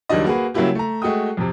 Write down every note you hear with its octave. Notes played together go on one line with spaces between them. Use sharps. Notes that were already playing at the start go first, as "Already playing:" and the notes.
C#2 D#3 F#3 G3 D4 D#5
A#3 F#4 G#4 B4
C#3 F#3 G3 A#3 E4 G4
A3 A#5
G#3 A3 F#4 G5 D#6
F2 C3